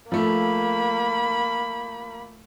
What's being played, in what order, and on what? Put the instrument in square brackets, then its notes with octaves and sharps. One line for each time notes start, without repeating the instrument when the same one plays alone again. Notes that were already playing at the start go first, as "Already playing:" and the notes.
[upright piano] F3 A3 [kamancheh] A#3 B5